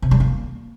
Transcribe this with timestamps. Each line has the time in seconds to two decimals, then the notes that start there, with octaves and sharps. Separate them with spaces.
0.02 C3
0.11 G3
0.20 A#3